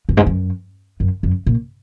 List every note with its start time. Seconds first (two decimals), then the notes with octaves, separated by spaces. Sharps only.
0.09 F#2
0.17 G#2
0.26 F#2
1.00 F#2
1.23 F#2
1.46 A#2